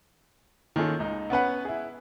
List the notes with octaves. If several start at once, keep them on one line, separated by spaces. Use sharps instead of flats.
D#3 A#3 C#4 F4 G#4 A4
C#2 D#4
B3 C#4 B4 F#5
E4 G#4